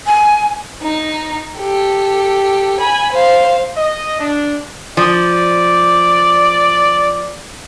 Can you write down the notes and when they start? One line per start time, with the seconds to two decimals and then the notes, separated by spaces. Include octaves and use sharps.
0.07 G#5
0.82 D#4
1.58 G4 A4
2.80 G#5 B5
3.13 C5 F5
3.77 D#5
4.20 D4
4.97 F3 D5